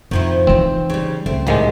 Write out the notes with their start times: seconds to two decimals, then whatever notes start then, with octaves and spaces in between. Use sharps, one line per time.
0.11 F2 D#3 F3 E4
0.47 E3 C4 D#4
0.90 C#3 G3
1.26 C#2 A3 C4
1.47 A1 G#2 D#3 G3 G#3 F5